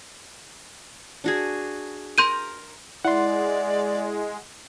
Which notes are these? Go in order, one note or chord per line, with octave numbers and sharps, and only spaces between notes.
D4 F#4 G#4
A#4 A#5 C6 G6 D#7
G#3 E4 D5 F#5 C6